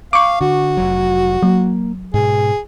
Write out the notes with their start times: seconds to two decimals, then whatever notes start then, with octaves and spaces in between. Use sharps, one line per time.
0.13 F5 C#6 D6
0.41 D3 F#4
0.77 F1 F#3
1.43 F#3 A#3
2.14 G#2 B2 G#4